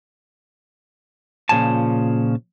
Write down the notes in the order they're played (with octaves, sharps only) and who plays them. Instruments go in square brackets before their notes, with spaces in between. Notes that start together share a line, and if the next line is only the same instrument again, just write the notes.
[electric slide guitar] A#2 C#3 F3 G#5 A5